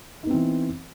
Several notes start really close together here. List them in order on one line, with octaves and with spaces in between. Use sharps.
D#4 B3 C4 E3